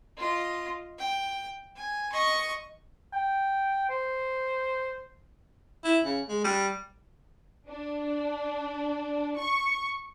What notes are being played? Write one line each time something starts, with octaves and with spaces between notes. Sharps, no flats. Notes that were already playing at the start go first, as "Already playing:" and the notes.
F4 D#5
G5
G#5
D#5 C#6
G5
C5
E4
C#3
G#3
G3
D4
C#6